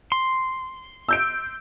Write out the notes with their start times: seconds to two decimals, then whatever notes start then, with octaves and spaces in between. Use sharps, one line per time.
0.12 C6
1.09 E6 G6 D7